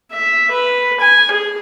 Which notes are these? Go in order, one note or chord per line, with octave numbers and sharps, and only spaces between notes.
E5
B4
G#5
G#4